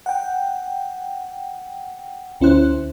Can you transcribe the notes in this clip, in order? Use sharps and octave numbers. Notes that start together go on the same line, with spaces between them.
F#5 G5
D2 C#4 E4 C5 F#6